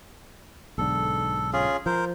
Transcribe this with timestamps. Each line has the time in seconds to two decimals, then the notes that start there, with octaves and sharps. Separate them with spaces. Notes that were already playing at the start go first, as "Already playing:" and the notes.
0.78 B1 G#2 D3 A4
1.53 C#4 F4 G#4
1.86 F3 A#4 C5